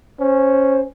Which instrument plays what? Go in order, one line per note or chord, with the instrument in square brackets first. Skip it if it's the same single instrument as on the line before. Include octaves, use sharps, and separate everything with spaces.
[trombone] C#4 [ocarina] C5